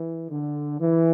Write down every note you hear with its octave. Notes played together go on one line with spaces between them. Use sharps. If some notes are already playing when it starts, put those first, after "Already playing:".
Already playing: E3
D3
E3